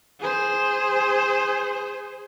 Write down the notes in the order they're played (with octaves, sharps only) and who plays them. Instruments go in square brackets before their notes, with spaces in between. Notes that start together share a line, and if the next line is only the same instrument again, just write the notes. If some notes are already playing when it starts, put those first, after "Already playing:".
[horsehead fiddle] G#4 C5